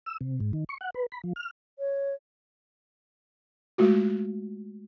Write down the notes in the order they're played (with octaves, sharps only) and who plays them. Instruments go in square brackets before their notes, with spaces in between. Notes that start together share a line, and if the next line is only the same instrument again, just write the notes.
[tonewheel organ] E6
C3
G#2
D#3
C#6
F#5
B4
B5
F3
F6
[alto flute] C#5
[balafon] G#3 A3 F4 F#4